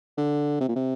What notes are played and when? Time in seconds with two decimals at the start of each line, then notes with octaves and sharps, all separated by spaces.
0.18 D3
0.61 C3
0.68 A#2
0.76 C3